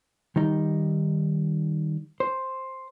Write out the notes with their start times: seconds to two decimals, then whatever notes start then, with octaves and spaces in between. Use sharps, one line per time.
0.36 D#3 G3 D#4
2.20 C5